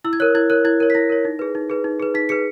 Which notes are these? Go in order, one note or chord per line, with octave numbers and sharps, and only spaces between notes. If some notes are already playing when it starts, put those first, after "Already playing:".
E4 E6
G#6
A#4 C#5 F#6
E4 G#6
A#4 C#5 F#6
E4 G#6
A#4 C#5
B6
E4 A#6
A#4 C#5
D#4
G#4 B4
D#4
G#4 B4
D#4
G#4 B4
D#4 B6
G#4 B4 C#7